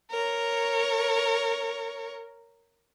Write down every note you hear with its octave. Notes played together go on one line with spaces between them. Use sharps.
A#4 C#5